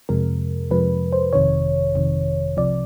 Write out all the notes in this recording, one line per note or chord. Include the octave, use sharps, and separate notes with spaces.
F2 C3 F3 G#3 A#4
F2 C3 F3 G#3 B4
C5
G1 F2 C3 D#3 C#5
G1 F2 C3 D#3
C2 C3 F3 D5